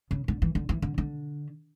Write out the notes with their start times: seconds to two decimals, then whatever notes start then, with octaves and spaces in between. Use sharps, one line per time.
0.11 C#3
0.28 D3
0.42 E3
0.55 D3
0.69 E3
0.82 D3
0.98 D3